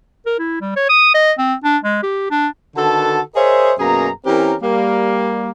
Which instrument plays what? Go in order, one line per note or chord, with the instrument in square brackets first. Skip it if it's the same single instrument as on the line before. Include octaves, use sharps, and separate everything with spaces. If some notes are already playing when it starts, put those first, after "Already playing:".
[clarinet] A#4
E4
G3
C#5
D#6
D#5
C4
D4
G#3
G4
D4
[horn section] D3 D#3 F#4 A4 B4 A5
G#4 A#4 C5 C#5 D#5 E5
F#2 B2 A#3 G#4 A#5
E3 C4 C#4 G4 A#4
G3 A#3